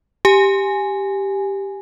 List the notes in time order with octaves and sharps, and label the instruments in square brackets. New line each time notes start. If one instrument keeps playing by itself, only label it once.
[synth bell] G4 G#5